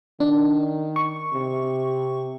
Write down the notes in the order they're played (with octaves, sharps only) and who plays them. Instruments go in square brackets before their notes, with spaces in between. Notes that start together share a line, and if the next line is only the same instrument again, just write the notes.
[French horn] D#3 [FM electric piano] D4
[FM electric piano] C#6
[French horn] C3